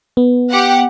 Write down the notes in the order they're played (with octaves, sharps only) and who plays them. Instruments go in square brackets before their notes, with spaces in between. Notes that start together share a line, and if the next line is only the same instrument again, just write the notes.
[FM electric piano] B3
[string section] G4 F#5